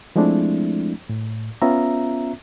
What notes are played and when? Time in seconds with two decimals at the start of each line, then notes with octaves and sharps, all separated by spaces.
0.16 F3 G#3 A3 C4 D4 E4
1.09 A2
1.62 B3 C#4 F4 E5 A#5